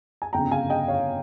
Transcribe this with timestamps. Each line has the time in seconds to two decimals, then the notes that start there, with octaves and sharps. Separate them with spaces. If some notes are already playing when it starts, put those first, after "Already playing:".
0.22 G#5
0.33 G1 F2 C#3 G5 A#5
0.51 F5 G#5
0.70 D#5 G5
0.88 C#5 F5